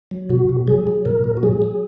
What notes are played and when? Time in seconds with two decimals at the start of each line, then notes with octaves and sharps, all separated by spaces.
0.11 F#3
0.29 B2 F#4
0.49 B2
0.67 F#3 G#4
0.87 F#3
1.05 A#2 A#4
1.24 A#2
1.37 F#4
1.43 F#3 G#4
1.62 F#3